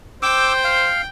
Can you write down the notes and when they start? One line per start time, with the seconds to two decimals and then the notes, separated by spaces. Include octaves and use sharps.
0.22 C5 G5 D6 E6
0.64 F5